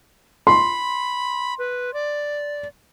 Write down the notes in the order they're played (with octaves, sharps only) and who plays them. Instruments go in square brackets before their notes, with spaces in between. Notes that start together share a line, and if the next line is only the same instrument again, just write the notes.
[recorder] B5 [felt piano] C6
[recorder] B4
D5